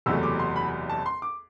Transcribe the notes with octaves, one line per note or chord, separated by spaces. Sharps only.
F#1 E2 C3 F#3 A3 E6
D6
C6
B5
A5
C6
D6